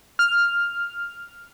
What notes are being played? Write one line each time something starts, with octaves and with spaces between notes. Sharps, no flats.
F6